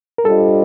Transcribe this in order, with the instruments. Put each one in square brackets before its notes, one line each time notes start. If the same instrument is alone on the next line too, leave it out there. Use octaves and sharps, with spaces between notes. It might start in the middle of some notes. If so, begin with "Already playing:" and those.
[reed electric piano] A#4
[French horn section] G3 D4 F4 C5 D#5 [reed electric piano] A4